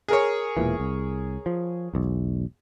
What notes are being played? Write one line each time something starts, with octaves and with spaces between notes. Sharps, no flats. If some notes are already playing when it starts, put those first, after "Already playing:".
G#4 A#4 C#5
E1 A#2 E3
C2
F3
E1 B1